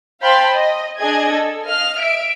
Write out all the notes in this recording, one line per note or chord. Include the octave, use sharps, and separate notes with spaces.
C5 F5 G5 A5 B5 C6
D#5
D4 G#4 D#5 G#6
A4
D#5 F5 F6
E5 D7